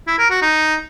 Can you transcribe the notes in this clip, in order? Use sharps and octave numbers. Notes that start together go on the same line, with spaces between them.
E4
A#4
F#4
D#4